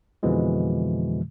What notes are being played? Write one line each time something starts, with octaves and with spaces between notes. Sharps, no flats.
F2 B2 D3 E3 F3 G#3